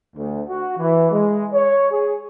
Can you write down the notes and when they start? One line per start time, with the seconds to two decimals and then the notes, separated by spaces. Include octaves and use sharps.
0.16 D2
0.47 F#4
0.77 E3
1.11 G#3
1.53 C#5
1.91 G#4